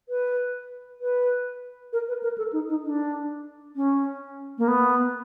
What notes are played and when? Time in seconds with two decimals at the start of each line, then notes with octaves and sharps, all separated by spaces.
0.09 B4
1.01 B4
1.93 A#4
2.08 B4
2.23 A#4
2.38 A4
2.53 D#4
2.69 D#4
2.85 D4
3.76 C#4
4.58 A#3
4.68 B3